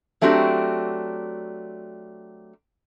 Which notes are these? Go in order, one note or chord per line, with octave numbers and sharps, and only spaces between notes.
F#3 A3 C4 D4 F#4 G4